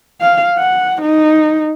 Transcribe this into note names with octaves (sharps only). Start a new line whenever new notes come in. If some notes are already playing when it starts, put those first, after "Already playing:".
F5
F#5
D#4